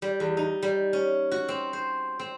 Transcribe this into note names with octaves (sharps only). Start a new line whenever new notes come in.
G3
E2
D#4
G3
C#4
F#4
C4
C5
C4